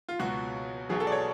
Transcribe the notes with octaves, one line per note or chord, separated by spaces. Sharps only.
F4
C#2 B2 F#3 F#4
B1 B2 F#3 G#4
A4
D5
C#5